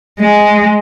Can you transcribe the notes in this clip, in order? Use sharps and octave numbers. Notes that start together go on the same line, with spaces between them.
G#3